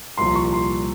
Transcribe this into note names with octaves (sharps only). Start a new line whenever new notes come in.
C2 A#2 F3 C6
C#6
C6